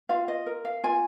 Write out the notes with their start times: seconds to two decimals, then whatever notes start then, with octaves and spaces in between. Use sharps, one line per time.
0.09 F4 F5
0.28 D#5
0.46 A#4
0.65 F5
0.84 F4 G#5